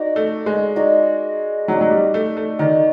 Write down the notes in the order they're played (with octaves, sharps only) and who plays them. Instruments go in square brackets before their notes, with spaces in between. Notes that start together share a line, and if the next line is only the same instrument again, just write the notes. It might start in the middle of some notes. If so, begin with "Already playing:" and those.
Already playing: [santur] D#4 F#4 A#4 D5
[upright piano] A3
G#3
[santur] D#4 F#4 A#4 D5
[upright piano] F#3 [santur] D#4 F#4 A#4 D5
[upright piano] F#3
G3
A3
A3
[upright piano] D#3 [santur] D#4 F#4 A#4 D5